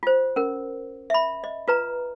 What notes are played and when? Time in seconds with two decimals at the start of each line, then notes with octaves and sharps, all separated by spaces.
0.03 F4 C5
0.36 C#4 A#4
1.10 E5 B5
1.44 D#5
1.68 F4 B4 A#5